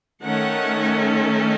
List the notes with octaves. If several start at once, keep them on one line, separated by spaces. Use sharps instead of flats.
D#3 A3 C#4 F#5